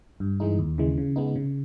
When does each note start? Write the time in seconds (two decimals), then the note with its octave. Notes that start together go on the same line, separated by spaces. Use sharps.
0.20 G2
0.40 E3 G#3 D#4
0.59 D#2
0.78 C#3 E3 G#3
0.98 C#3
1.16 G#3 B3 D#4
1.36 C#3